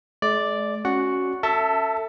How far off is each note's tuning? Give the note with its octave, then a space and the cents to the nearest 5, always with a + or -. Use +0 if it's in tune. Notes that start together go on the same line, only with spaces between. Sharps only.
G#3 +45 D5 +0
C#4 +0 F#4 +0 F#5 +0
A4 +30 E5 +0 A5 +0